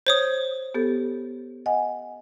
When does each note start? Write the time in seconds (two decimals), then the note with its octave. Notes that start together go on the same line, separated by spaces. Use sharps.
0.07 C5 C#5 D#6
0.74 B3 G4 A4
1.66 D#5 F#5 G#5